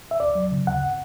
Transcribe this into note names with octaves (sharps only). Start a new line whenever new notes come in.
E5
D2 D5
F#3
C#3
D2 F#5